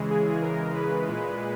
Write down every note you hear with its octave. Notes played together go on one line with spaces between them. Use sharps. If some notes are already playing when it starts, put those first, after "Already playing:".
Already playing: C#3 E3 G#3
G#4
A#4
B4
A#2 G#3